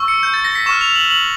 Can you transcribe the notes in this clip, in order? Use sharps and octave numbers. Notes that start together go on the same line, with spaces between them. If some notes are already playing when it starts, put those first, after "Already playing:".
Already playing: C#6 E6
C#7
G6
A6
A#6
B6
C#6 F6 E7
F7
F#7
F#7